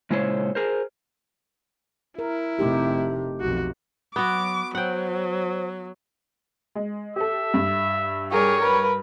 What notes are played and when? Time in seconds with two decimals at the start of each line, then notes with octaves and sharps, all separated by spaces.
0.10 A#2 C#3 G#3 E4 C5 C#5
0.55 G#4 A#4 C5
2.19 E4 A#4
2.59 F1 C3 A3 D#4 G4
3.41 B1 F2 F#4
4.16 F#3 B3 F#4 D6
4.75 F#3 C5 F#5 G5
6.75 G#3
7.16 G4 A4 E5
7.54 G2
8.31 G3 G#4 A#4 C#5
8.60 A#4 B4